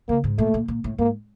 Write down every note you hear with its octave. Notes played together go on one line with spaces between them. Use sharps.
C#3 A#3
G#2
A#2 A3
A#2
A#2
A2
G#2 A#3